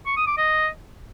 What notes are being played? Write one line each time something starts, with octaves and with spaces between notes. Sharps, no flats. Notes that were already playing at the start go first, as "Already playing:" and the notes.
C#6
D#6
D6
D#5